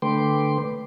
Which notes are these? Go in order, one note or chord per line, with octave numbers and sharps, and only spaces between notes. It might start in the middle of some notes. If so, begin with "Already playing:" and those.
D3 A3 B4 G5 C6 D6